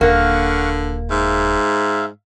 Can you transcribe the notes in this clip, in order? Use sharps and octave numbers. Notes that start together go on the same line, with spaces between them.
D#1 D3 A#3 F5 F#5 C#6
G#2 E5 F5